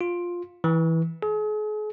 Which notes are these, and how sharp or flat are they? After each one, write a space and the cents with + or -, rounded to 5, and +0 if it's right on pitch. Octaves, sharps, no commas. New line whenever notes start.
F4 +10
E3 -15
G#4 +40